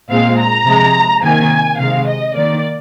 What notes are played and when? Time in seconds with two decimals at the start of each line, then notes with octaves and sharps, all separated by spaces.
0.10 A#2 G#3 C4 F5
0.38 A#5
0.66 C3 F3 G#3
1.23 C3 D#3 A#3 G#5
1.79 C3 D#3 G#3 F5
2.07 D#5
2.34 D#3 A#3 D5